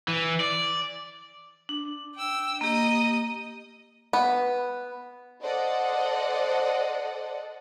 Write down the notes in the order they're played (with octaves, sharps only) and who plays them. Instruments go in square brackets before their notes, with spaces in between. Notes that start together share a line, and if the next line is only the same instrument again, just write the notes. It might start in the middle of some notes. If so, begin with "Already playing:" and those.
[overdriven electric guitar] E3
D5
[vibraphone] D4
[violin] G5 E6
[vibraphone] A#3 G4 [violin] D#5 D#6
[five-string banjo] B3
[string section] A4 C5 D5 D#5 F#5